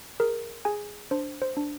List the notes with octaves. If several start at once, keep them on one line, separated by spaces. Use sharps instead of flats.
G#4 A#4
G#4 G#5
D4 C5
C5
D4